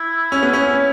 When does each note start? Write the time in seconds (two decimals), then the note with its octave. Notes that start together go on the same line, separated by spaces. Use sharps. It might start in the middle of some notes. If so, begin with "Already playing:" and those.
Already playing: E4
0.32 C#4
0.43 B3
0.53 C#4